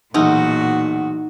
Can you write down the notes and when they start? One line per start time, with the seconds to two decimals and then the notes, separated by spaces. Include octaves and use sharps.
0.15 B1 E2 A#2 D#4 F#4